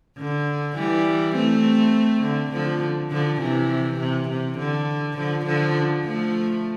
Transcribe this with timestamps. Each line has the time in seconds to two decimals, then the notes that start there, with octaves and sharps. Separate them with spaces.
0.17 D3
0.76 E3 G3
1.35 A3 C4
2.23 D3
2.52 D3 F3
3.10 D3 F3
3.40 C3 E3
3.99 C3
4.29 C3
4.58 D3
5.16 D3 F3
5.46 D3 F3
6.04 F3 A3